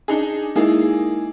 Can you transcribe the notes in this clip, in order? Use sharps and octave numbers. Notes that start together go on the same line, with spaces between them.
D4 D#4 G#4
G#3 A#3 D#4 E4 G#4